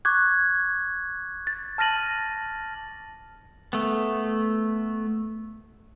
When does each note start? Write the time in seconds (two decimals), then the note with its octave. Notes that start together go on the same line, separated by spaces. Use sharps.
0.05 C#6 D6 F#6 G#6
1.47 A6
1.78 A5 F6 A6 A#6 D#7 F#7
3.73 A3 B3